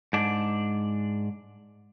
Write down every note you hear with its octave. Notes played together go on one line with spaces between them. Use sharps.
G#2 D4